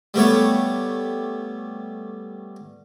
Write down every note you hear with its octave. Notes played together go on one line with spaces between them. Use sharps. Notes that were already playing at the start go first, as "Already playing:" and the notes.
G3 A3 B3 C#5